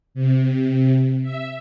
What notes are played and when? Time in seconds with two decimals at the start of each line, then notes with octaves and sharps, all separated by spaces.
0.14 C3
1.23 E5